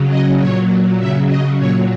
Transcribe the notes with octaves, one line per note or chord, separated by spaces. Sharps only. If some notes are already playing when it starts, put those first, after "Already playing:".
Already playing: C#3 F#3
D#5
A#2 F#3 C#5
C#3 F#3 E5
D#5
A#2 F#3 C#5